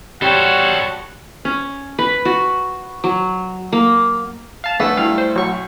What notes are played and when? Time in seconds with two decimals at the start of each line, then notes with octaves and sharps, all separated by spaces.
0.22 G3 F#4 A4 C5 C#5 F#5
1.45 C#4
1.99 B4
2.25 F#4
3.04 F#3
3.72 A#3
4.64 F5 A5
4.80 D3 A3 G#4 B4
4.97 G2 E4 F5
5.18 C5
5.36 B1 F#3 C#6